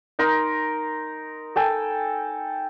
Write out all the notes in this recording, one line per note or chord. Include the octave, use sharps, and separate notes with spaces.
D#4 A#4 C6
A4 G5 G#5